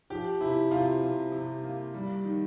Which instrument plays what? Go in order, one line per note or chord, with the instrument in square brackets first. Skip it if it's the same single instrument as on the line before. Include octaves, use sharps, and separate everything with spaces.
[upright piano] F3 G4
C3 E4
C3 F4
C3
C3
A#3
G3
D#3